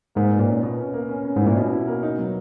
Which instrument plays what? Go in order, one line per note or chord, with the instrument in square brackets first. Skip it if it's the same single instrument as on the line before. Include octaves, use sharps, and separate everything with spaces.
[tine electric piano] G#2 [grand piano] A#3
[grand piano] B2
[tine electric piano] A#2
[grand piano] C#4
B2
C#4
A#3
C#4
C#4
[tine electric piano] G#2 [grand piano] E4
[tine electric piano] A#2
[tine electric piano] B2 [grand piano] C#4
[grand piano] E4
A#3
D#4
F#3